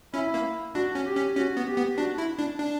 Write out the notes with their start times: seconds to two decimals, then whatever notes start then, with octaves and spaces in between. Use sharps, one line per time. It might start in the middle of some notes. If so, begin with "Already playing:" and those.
0.13 C#4 E4
0.34 A#3
0.74 D4 F#4
0.95 C#4
1.06 G4
1.16 C#4
1.36 C#4 F#4
1.57 B3
1.67 G4
1.77 B3
1.98 D4 F#4
2.18 E4
2.39 D4
2.59 D4